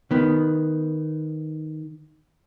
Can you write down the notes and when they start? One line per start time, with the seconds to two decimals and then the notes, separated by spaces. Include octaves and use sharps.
0.11 D#3 B3